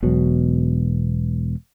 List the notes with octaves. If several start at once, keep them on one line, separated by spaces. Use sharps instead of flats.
E1 B2 F#3